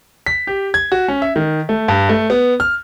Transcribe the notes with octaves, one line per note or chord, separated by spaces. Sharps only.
B6
G4
G#6
F#4
C#4
E5
D#3
A3
G2
A3
B3
F6